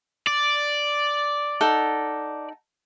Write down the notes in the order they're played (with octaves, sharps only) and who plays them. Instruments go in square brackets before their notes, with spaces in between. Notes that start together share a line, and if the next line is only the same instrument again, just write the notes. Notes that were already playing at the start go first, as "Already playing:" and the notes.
[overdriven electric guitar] D5
[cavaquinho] D#4 A4 F#5